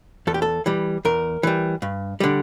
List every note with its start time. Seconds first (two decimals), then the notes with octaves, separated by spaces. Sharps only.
0.27 E2 A4
0.34 G4
0.42 A4
0.66 E3 G3
1.05 E2 A#4
1.43 E3 G3
1.82 G2
2.20 D3 G3